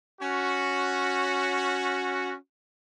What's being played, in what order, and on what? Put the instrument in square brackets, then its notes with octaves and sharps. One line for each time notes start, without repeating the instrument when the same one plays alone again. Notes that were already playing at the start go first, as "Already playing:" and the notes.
[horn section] C#4 F#4